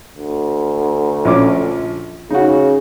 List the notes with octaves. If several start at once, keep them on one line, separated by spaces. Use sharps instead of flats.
D2
A#1 C#4 D6
C#3 D#4 F#4